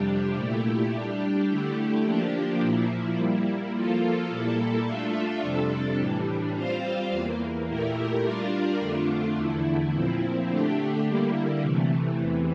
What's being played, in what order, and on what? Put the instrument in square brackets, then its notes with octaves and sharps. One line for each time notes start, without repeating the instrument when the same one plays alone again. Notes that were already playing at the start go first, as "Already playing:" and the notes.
Already playing: [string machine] F2 C3 G3 D4 G4
A#2 A3 E4 G4
G3 D4 G4
D3 A3 E4 G4
F3 A#3 D4 G4
A#2 F3 A#3 E4
G3 A#3 E4
F3 A#3 F4 A4
A#2 G3 A#3 E4 A4
A3 D4 F4 A4 E5
F2 C3 G3 D4 A4
A2 E3 G3 D4
G3 C4 F4 C5 F5
E2 E3 A#3
A#2 A3 E4 G4 A#4
G3 D4 F4 A#4 D5
F2 D3 A3 D4 F4
E2 D3 A3 E4
A#2 F3 C4 E4
D3 A3 D4 G4
D3 G3 A#3 E4
C3 E3 A3
E2 C3 E3